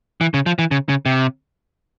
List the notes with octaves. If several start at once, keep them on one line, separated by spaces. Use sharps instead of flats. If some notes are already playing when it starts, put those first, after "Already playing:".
E3
C#3
F3
E3
C#3
C#3
C3